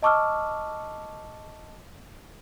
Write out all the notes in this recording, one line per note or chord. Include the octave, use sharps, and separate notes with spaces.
D#5 A5 C#6 D6 E6 F6